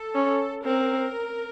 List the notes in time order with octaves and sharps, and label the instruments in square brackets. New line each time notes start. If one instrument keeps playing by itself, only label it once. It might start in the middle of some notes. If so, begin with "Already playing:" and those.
Already playing: [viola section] A4
[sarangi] C#4
[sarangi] C4 [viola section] A#4